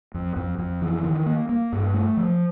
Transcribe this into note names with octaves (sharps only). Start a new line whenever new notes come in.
F2
F2
F2
E3
D#3
A#3
A#3
G2
A3
F3